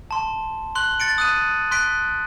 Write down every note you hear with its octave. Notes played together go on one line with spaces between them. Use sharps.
A5 C6
C6 F#6 F#7
A6 C#7 D7
D#6 F#6 D#7
C6 F#6 B6 D7